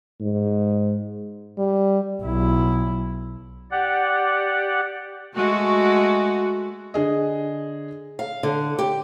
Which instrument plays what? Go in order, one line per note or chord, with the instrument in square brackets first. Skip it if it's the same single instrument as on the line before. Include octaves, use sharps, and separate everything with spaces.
[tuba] G#2
[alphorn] G3
[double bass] B1 E4
[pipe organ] G4 D5 F#5
[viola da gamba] G#3 A3 [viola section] F#4
[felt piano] D3 G#4 D#5
[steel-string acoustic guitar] F5
D3
G4